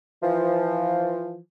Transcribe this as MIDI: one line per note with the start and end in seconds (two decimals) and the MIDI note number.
0.23 1.39 52
0.23 1.39 53